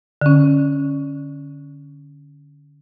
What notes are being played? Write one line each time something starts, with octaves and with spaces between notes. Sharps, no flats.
D3 C#4